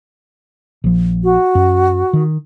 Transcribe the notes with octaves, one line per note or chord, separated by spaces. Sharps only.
A#1 F3
F#4
F#2
D#3